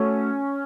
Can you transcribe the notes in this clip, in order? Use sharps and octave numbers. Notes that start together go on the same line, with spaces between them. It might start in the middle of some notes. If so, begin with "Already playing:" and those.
Already playing: A3 C#4 F#4 A4